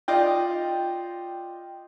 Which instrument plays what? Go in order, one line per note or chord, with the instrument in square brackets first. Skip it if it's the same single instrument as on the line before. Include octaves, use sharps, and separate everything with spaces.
[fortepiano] F4 D5 D#5 [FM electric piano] G5